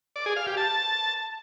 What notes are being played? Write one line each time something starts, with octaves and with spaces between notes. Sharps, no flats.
D5
G#4
F5
G4
A5